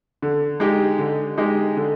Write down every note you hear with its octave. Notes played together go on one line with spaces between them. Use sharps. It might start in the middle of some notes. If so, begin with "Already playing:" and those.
D3
G#3 D#4 G4
D3
G#3 D#4 G4
D3